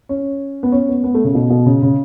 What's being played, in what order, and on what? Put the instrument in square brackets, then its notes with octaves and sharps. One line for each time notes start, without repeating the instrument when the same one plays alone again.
[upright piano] C#4
B3
C#4
B3
B3
A3
C#3
B2
B2
C#3
C#3